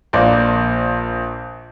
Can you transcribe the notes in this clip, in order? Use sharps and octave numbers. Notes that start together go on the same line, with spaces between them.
A#1 A#3 C5 D5